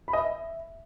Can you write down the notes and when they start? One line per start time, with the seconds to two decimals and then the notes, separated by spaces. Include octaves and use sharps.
0.08 B5
0.13 D#5
0.19 E5